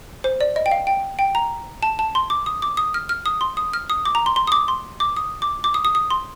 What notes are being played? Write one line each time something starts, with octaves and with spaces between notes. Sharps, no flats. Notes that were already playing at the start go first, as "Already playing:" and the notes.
C5
D5
D#5
G5
F5
G5
G5
A#5
A5
A5
C6
D6
D#6
D6
D#6
F6
F6
D#6
C6
D#6
F6
D#6
D6
A#5
C6
C6
D#6
D6
C6
D6
D#6
D6
D6
D#6
D#6
D#6
C6